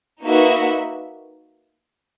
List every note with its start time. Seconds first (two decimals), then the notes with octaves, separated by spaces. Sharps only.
0.24 A#3 D#4 F#4 B4 E5